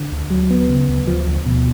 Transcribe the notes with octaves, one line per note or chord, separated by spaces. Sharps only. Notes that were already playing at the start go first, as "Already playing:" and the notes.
Already playing: D3
D2
F#3
B3
C#3
D2
F3
D2
B2